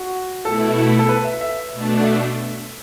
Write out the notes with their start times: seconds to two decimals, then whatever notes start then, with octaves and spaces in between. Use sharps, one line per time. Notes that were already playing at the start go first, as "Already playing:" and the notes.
Already playing: F#4
0.45 B2 A3 E4 A4
0.99 A4
1.09 B4
1.24 E5
1.41 E5
1.72 B2 A3 D4
2.04 E5